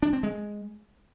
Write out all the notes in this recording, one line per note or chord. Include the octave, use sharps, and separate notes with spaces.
D4
C4
G#3